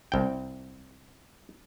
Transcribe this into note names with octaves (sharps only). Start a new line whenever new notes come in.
C2 G5